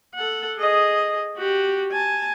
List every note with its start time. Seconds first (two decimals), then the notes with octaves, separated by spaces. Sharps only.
0.15 A4 F#5
0.58 G#4 D#5
1.37 F#4 G4
1.92 G#5 A5